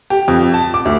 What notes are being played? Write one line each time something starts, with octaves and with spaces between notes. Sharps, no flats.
G4
F2
A5
D6
D2